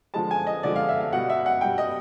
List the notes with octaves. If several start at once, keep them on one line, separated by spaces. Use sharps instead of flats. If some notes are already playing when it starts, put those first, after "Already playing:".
D3 F3 G#3 A5
G#5
D#5
D3 F3 G#3 D5
F5
E5
F5
B2 G3 F#5
E5
F#5
B2 G3 G5
D#5